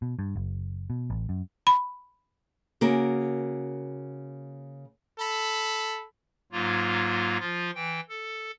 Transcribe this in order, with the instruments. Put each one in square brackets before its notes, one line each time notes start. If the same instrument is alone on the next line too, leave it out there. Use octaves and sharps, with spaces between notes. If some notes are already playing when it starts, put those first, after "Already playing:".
[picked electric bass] B2
G2
F#1
B2
A1
F#2
[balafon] B5
[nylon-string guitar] C#3 A#3 F#4 A#4
[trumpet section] A4 B5
[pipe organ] G#2 F#3 A#3 F4
F3 F4
E3 G5
A4